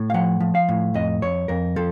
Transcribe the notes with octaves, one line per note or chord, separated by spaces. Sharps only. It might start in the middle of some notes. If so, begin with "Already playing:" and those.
Already playing: A2
F5
F3 F#5
F3
F5
A2
F2 D#5
F2 C#5
F2 A#4
F3 A4